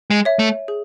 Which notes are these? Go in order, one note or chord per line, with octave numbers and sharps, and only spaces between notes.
G#3
C#5 E5
A3
G#4